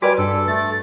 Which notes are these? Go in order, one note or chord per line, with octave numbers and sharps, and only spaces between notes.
G3 F#4 B4 D5 G#5 D6
G2 A4
A3 A6